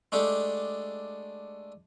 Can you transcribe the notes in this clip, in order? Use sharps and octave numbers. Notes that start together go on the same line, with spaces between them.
G#3 A3 D4 G4 A4